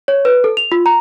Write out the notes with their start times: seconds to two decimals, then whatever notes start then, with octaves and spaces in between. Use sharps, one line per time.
0.08 C#5
0.25 B4
0.44 A4
0.57 F7
0.72 F4
0.86 A#5